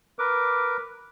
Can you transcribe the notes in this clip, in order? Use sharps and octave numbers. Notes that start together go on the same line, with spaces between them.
A#4 B4 D6